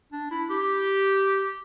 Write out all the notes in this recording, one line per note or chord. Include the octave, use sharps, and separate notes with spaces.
D4
E4
G4